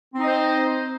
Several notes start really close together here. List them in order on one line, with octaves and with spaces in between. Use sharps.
C4 D#4 D#5 C5